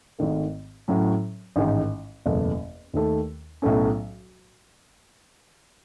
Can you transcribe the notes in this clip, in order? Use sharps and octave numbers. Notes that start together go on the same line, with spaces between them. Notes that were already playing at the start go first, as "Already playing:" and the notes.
G#1 G#2 D#3 A3
A2 F#3 C#4
A1 G#2 D#3 G#3 D#4
F#1 E2 B2 A3
D#2 D#3 A3
B1 A2 F#3 A3 C#4